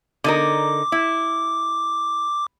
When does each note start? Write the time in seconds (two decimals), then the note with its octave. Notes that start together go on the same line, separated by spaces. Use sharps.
0.24 D3 D#4 A#4 D6
0.92 E4